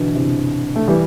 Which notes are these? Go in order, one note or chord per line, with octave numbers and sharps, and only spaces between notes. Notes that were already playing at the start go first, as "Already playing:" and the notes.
Already playing: B2 D3 E3
C3 E3
A3
E3 G3